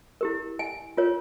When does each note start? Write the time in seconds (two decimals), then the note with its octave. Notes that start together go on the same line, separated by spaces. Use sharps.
0.21 E4 G4 A#4
0.59 G#5
0.97 F4 A#4 C#5